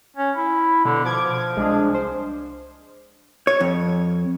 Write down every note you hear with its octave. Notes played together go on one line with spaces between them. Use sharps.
C#4
E4
B2 D3
F3 D6 G#6
C2 G#3 D4 G#4
C5
C#5
F2